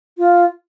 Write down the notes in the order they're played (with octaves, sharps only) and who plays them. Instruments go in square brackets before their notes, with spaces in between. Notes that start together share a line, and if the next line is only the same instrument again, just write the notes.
[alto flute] F4